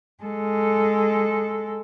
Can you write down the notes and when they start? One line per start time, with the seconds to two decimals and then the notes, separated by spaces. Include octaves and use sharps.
0.24 G#3 A4